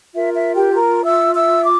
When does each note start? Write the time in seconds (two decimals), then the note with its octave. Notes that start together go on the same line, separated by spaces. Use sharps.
0.14 F4 A#4 E5
0.35 E5
0.54 G4 G5
0.74 A#4 A#5
1.04 E5 E6
1.35 E5 E6
1.64 D6